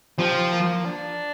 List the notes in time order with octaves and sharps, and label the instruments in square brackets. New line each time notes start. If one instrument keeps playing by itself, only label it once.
[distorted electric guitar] F3 [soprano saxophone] G4
[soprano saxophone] A#3
D4